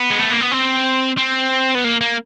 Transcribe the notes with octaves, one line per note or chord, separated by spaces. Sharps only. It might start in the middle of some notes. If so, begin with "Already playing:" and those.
Already playing: B3
G#3
A3
A#3
B3
C4
C4
B3
A#3
A#3